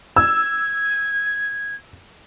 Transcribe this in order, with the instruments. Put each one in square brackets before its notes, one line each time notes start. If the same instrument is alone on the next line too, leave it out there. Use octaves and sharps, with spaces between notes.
[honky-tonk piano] E6 [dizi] G#6